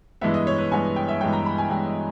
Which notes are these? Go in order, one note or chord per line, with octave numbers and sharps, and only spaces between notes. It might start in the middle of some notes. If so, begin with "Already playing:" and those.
G2 E3 G#3 B3 E5
D#5
C#5
B4
G2 E3 G#3 B3 G#5
G5
E5
G2 E3 G#3 B3 G5
A#5
B5
G#5
G2 E3 G#3 B3 G5
D#5